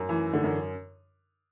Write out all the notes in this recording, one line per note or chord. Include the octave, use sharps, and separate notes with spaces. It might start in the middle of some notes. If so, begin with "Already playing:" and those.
Already playing: F#2
E3
D3
F#2